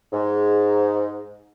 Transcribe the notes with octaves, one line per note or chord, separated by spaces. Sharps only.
G#2